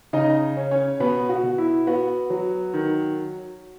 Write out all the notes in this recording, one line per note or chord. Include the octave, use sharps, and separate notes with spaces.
C#3 D#4 D#5
C#4
C#4 C#5
B2 B3 B4
F#4
B2
E4
B3 F#4
F#3
D#3